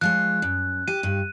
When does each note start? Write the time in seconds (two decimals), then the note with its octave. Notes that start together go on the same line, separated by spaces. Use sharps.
0.01 F3 G#3 C#5 F#6
0.42 F#2
0.88 G4 D#7
1.03 G2 D#4